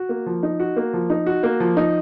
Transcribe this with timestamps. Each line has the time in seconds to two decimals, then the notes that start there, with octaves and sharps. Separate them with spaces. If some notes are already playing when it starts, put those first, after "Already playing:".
Already playing: F#4
0.09 A#3
0.26 F3
0.43 D#4
0.60 F#4
0.76 A#3
0.93 F3
1.10 D#4
1.26 F#4
1.43 A#3
1.60 F3
1.77 D#4